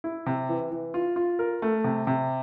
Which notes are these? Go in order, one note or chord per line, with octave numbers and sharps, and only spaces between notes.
E4
C3
E3
E3
F4
F4
A#4
A3
C3
C3